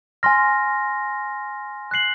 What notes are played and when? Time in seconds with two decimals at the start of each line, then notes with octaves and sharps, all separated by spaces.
0.23 G#5 C6 F6 A#6
1.91 F#6 C7 F#7